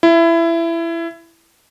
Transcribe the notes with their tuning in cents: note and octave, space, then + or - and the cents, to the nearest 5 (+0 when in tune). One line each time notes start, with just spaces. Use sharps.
E4 +20